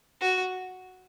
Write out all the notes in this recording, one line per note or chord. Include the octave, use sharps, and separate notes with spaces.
F#4